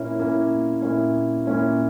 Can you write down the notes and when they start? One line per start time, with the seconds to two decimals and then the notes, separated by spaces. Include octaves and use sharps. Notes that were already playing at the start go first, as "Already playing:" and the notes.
Already playing: A#2 A#3 C#4 E4
0.20 A#2 A#3 C#4 E4
0.82 A#2 A#3 C#4 E4
1.46 A#2 A#3 C#4 E4